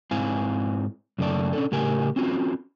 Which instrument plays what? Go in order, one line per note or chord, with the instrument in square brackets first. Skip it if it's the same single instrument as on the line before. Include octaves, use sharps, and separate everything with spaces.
[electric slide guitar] G#2 C4 E4 F5 G#5
F#2 C#3 A3 C#4 D5 A5
C#4 D4 A4
A2 C#3 G4 A#4 G#5
C4 C#4 F4 F#4